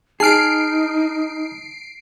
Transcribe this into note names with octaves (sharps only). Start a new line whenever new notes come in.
D#4 G#4 A5 F6 C7 D7